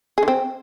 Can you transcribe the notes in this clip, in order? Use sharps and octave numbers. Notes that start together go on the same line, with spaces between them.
G#4
D3
C4